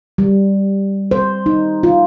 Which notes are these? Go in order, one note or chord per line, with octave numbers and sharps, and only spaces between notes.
G3
C5
D#4
F4